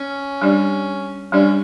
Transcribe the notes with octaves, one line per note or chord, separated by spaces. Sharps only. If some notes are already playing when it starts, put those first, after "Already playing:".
Already playing: C#4
G3 D4 G4 D5
G3 C#4 D4 G4 D5